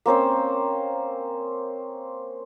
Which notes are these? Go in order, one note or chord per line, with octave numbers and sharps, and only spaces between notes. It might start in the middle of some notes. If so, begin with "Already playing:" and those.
A#3 C4 C#4 C5